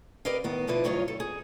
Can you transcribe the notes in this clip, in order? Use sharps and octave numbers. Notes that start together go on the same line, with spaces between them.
G4 A#4 B4 D5 D#5 F5
A2 D#3 B3
B2 D3 F3 E4 B4 D5
D2 G2 F#3 F4 C#5 D#5
A4
G#4